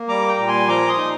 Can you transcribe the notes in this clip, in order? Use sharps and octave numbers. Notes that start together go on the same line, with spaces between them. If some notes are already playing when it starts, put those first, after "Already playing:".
Already playing: A#3
G3 A#5 D6
G5 A#5
A#2
G#5 C6
F3 A#5 D6
C6 D#6
D#4